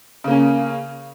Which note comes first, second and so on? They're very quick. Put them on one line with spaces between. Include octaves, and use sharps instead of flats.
C#3 A#3 C#4